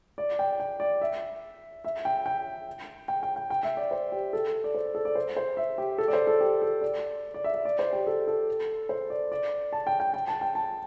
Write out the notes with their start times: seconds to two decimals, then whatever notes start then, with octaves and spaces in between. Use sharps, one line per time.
0.18 D5
0.39 G5
0.60 G5
0.80 D5
1.01 E5
1.85 E5
2.05 G5
2.26 G5
3.08 G5
3.23 G5
3.36 G5
3.50 G5
3.63 E5
3.77 D5
3.91 C5
4.12 G4
4.33 A4
4.64 D5
4.75 C5
4.95 A4
5.05 D5
5.15 C5
5.37 C5
5.57 E5
5.78 G4
5.98 A4
6.08 D5
6.13 C5
6.27 A4
6.41 G4
6.62 A4
6.81 D5
7.34 D5
7.44 E5
7.54 E5
7.65 D5
7.79 C5
7.93 G4
8.07 A4
8.28 A4
8.89 C5
9.10 D5
9.32 D5
9.73 A5
9.87 G5
10.00 G5
10.14 G5
10.28 A5
10.41 G5
10.55 A5